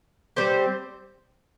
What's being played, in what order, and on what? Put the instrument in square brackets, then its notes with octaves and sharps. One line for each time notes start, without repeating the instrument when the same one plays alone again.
[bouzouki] G3 C4 G4 C5